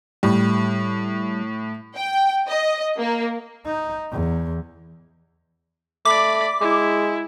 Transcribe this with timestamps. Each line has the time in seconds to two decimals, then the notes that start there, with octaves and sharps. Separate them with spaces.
0.23 A2 G3
1.96 G5
2.47 D#5
3.00 A#3
3.66 D#4
4.11 E2
6.05 A3 D5 B5 D6
6.61 G#3 E4